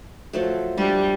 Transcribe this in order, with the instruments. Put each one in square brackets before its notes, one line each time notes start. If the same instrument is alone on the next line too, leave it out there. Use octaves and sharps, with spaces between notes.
[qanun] F3 F#3 A3
[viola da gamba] G3 [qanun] D4